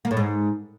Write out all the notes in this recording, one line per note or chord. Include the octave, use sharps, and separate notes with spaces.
A#3
A2
G#2